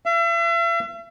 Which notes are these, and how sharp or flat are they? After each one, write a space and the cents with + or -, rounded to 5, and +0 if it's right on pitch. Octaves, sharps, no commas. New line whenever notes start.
E5 +40